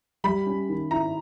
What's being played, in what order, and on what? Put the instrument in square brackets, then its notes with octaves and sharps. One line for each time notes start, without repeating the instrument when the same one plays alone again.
[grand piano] G3 [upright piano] B5
[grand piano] C#4
D#3
[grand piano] E4 [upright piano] A#5